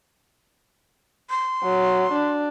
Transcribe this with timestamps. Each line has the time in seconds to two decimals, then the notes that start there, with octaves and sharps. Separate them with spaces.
1.30 C6
1.64 F#3
2.13 D4